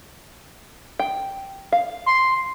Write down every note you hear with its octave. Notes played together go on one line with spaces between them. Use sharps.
G5
F5
C6